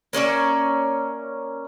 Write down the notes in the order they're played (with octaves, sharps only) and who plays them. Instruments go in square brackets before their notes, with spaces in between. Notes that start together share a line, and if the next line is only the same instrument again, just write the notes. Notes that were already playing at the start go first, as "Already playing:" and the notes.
[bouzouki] A#3 C#4 D5 E5